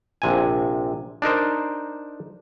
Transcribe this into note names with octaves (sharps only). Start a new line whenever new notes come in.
A#1 C3 G#5
D4 D#4 A#4 C5